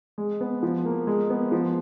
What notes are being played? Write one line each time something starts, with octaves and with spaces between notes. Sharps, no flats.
G#3
B3
F3
A#3
G#3
B3
F3